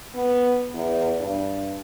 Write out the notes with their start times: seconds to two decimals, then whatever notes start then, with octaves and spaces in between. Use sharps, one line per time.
0.14 B3
0.74 E2
1.19 G2